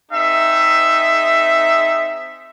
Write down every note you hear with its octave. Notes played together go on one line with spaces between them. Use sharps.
C4 D#4 G#4 E5